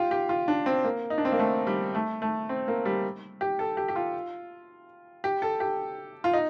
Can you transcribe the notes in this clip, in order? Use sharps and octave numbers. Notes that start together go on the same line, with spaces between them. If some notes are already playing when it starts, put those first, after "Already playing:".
Already playing: F4 G4
G4
F4
D4
C4
A#3
D#4
D4
C4
A#3
A3
G3
A3
A3
C4
A#3
G3
G4
A4
G4
G4
F4
G4
A4
G4
F4
D#4